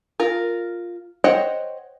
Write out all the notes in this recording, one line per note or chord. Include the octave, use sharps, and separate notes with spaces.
F4 A#4
C5 C#5 D#5 F#5 G5